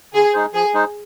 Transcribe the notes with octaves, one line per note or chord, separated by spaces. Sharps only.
D3 G#4
G#3 D#4 G#4 C5
F3 G#4
G#3 D#4 G#4 C5